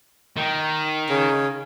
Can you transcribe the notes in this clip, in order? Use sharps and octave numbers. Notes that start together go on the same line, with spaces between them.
D#3
C#3